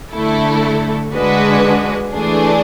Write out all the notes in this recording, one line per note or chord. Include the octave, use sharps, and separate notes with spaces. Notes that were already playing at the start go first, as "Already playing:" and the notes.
D3 A3 E4 A4
D3 G#3 D4 F#4 B4
E3 A3 D4 G#4